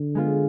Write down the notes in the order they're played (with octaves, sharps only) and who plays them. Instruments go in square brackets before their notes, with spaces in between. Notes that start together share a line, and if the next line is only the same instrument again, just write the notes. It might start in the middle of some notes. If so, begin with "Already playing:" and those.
Already playing: [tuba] D3
[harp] G#3 B3 F4